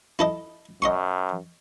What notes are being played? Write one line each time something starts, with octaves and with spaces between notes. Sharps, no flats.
E4 A4 D#5
F#2 D#5 C6 C#6